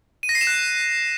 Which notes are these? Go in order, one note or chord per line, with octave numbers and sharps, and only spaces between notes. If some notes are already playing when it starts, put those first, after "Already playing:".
D#7
A#6
C7
E7
F#6